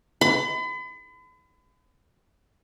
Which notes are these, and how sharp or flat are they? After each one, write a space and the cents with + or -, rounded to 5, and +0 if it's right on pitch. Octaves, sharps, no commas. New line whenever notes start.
B5 +40